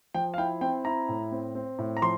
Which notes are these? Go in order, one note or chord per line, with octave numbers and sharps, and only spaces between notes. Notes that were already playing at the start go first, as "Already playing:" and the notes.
F3 G5
F5
E4 G5
C4 G5
E4 A#5
A2
C4
C4
A2
A#5
F3 C6